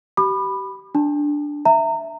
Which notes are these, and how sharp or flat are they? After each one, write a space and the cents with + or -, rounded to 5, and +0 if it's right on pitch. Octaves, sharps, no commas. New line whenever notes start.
G4 -30 B5 +0 D6 +45
D4 +0 A5 +0
E5 +0 A#5 -25